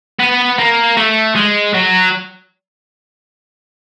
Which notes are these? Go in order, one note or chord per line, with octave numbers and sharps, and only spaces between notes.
B3
A#3
A3
G#3
F#3